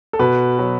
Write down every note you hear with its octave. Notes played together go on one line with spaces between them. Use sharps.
A4
B2 B4
F#3